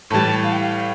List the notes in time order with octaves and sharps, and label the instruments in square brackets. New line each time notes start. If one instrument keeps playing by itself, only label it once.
[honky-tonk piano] A2 E3 G3 [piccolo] A5
[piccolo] F5
G5
F5